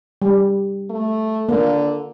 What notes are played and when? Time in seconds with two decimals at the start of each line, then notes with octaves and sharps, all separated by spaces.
0.22 G3
0.90 A3
1.49 D3 A#3